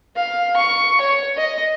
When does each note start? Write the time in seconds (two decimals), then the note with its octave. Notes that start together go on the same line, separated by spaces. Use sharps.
0.16 F5
0.57 C#6
1.01 C#5
1.37 D#5